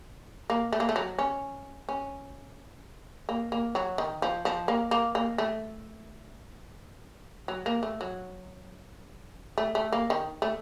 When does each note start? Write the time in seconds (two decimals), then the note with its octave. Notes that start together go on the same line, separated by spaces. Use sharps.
0.50 A#3
0.73 A3
0.80 A#3
0.89 A3
0.96 F#3
1.19 C#4
1.89 C#4
3.29 A#3
3.52 A#3
3.75 F#3
3.98 D#3
4.22 F3
4.45 F3
4.68 A#3
4.91 A#3
5.15 A#3
5.38 A3
7.48 F#3
7.66 A#3
7.83 A3
8.01 F#3
9.58 A3
9.75 A3
9.93 A#3
10.10 D#3
10.42 A3